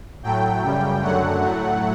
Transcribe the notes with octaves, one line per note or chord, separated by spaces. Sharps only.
A2 F#3 A3 G5
F#2 C#3 G3
F#2 D3 F#3 A3 F#5
A2 F#3 A3